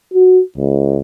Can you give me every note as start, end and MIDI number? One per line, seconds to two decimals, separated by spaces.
0.14 0.41 66
0.58 0.99 37